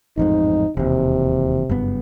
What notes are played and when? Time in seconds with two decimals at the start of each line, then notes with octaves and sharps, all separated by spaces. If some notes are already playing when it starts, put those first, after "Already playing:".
0.17 A1 F2 G#2 D#4
0.77 E1 D#2 C3
1.69 F#1 G2 B3